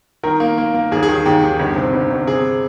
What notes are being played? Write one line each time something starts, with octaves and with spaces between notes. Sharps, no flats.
D#3 A#4
A#3
A#3
A#3
D#2 G#4
G#4
D#3
D#2 G4
D#3
G1
C3
G1
G1
C3 G#4